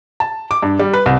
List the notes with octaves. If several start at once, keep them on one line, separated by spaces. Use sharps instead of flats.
A5
D6
G2
G3
B4
C2